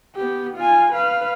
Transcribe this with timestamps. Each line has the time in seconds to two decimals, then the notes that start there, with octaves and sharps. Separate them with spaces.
0.16 B3 G4
0.56 F4 G#5
0.93 B4 F5